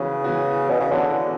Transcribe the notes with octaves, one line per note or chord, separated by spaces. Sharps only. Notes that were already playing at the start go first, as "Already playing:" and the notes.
Already playing: C#3 E3 B3 F#4
E3 B3 F#4
B2
C#3
D3 E3 B3 F#4